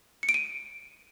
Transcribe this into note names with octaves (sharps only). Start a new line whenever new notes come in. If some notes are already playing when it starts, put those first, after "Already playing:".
C#7
D7
D#7